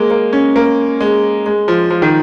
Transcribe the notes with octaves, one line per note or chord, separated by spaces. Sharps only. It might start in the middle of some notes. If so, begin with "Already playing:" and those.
Already playing: G#3 A#3
A#3
C#4
A#3
G#3
G#3
F3
F3
D#3